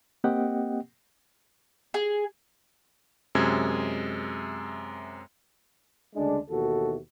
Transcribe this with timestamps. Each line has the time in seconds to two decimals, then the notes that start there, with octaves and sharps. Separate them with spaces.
0.24 A#3 C4 G4 D#5 F#5 G5
1.94 G#4
3.35 F#2 C3 G#3 G#6
6.15 D2 C#3 G#3 D4
6.50 D#2 B2 E3 F#4 A4